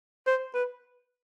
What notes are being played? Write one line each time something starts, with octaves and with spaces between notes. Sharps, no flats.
C5
B4